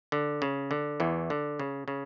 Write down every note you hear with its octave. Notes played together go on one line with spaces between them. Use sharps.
D3
C#3
D3
E2 E3
D3
C#3
C#3